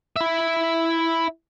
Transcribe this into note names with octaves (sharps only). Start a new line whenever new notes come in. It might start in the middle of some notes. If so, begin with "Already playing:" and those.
E4 E5